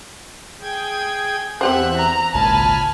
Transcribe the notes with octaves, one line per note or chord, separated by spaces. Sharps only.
G#4 G5 G#6
E2 C4 G4 C5 E5 F#5 F#6
A#5
G#1 C#2 A#2 G#5 A5 B5 F6